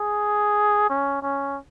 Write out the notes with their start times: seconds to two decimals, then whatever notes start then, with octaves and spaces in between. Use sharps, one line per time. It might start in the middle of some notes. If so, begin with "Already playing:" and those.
Already playing: G#4
0.90 C#4
1.23 C#4